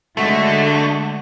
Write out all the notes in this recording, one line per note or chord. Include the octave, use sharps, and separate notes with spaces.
D3 G#3 A3 F#4